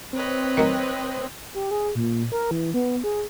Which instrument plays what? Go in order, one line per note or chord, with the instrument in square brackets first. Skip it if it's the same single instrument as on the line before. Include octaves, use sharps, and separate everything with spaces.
[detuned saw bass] C4 [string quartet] B4 C#5 D#5
[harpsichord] D#3 F#3
[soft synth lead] G4
G#4
A#2
A#4
E3
B3
G#4